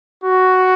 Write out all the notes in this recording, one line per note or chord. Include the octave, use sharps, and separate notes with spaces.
F#4